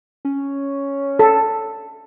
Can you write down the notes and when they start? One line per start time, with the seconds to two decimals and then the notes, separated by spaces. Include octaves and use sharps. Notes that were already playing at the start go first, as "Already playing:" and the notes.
0.25 C#4
1.19 A4